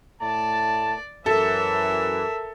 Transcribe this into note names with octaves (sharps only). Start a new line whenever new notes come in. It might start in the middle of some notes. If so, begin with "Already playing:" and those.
A2 A3 D5 A5
F#2 E3 A4 A#4 E5